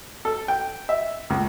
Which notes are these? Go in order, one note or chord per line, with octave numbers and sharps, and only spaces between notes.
A4
G5
E5
C#2